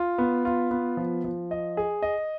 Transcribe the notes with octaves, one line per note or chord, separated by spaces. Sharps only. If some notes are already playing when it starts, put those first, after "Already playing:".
Already playing: F4
B3
F4
B3
F3
F3
D#5
G#4
D#5